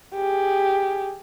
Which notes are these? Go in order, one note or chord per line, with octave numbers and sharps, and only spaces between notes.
G4 G#4